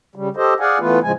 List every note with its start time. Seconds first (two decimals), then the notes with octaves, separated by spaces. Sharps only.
0.15 C#3 G3
0.36 G4 A4 C5 D#5
0.60 G#4 D5 F5 F#5 G#5
0.80 E3 A3 B3 F4 B4
1.03 A2 C#3 F3 G#3 G#5